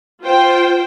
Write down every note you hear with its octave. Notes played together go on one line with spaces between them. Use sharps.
F4 C5 G5